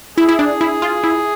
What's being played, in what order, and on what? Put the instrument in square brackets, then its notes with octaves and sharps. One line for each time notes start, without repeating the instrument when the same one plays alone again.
[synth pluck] E4 [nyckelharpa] G#4
[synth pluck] E4
D4
E4
F4
E4